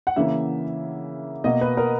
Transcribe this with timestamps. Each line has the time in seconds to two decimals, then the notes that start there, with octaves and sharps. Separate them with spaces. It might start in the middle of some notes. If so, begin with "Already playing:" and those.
0.07 F#5
0.16 C#3 E3 A#3 E5
1.44 B2 A#3 D#5
1.61 B4
1.77 A#4